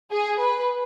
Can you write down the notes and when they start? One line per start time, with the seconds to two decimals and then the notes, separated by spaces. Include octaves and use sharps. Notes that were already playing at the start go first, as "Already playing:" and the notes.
0.12 G#4
0.41 B4